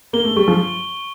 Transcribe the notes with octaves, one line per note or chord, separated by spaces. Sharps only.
A#3 G7
A3
G3 C#6
F3